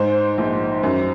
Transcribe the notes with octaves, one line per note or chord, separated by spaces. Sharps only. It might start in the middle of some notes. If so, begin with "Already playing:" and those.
Already playing: G#2 C5
A#1
F#2